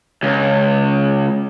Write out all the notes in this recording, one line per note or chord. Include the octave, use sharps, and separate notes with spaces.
C#2